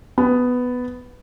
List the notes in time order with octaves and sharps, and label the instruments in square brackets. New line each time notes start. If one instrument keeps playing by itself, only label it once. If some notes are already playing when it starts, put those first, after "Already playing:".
[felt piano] B3